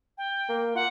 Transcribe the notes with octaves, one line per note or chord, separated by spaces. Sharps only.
G5
A#3
F4 F#5